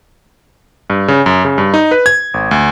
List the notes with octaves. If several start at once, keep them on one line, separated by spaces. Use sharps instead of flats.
G2
C#3
F#2
C#3
G2
D#4
B4
G#6
G#1
D2